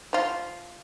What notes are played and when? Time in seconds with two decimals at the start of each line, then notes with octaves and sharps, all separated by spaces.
0.13 F3 F4